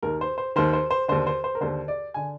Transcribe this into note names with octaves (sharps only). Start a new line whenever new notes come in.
D#2 D#3 A#4
C5
C5
D#2 D#3 C5
C5
C5
D#2 D3 C5
C5
C5
A#4
D#2 D3 C5
D5
D3 G#5